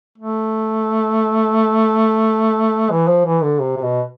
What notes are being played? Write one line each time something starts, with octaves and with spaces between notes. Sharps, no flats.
A3
E3
F3
E3
D3
C3
C3
B2